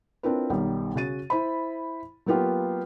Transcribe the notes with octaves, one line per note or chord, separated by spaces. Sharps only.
C4 D4 E4 F4 A#4 B4
B1 D#3 G3
C#3 F#4 A6 D#7
E4 C5 B5
F#3 A#3 B3 F4 G4